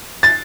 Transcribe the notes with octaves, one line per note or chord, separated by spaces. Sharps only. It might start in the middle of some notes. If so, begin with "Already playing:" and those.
A6